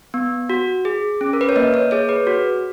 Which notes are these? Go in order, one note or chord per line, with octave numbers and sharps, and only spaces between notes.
B3
F#4
G#4
C#4
A#4
B4
C#5
A#3 D#5
C#5
G#4 C#5
B4
F#4